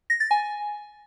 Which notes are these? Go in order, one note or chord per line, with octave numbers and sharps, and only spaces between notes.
A#6
A6
G#5